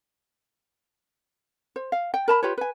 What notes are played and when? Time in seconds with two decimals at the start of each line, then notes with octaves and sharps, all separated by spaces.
1.76 C5
1.92 F5
2.14 G5
2.28 A#4 A5 B5
2.43 F4 G4 B4 C#5
2.58 B4 G#5